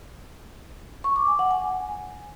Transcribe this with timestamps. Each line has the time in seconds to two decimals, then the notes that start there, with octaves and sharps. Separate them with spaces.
1.04 C#6
1.16 D6
1.28 G#5
1.39 F#5
1.51 G#5